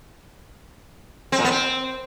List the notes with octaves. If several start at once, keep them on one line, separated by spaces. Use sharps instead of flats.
C4
A#2
B3
C4